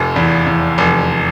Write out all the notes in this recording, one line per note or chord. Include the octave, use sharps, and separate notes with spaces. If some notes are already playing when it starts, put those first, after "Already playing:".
Already playing: F1 F2
E2
E2
F1